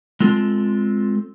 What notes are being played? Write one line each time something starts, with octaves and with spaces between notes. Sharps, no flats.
G#3 C4 F4 A4